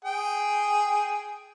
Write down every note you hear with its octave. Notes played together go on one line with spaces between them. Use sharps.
G#4 G5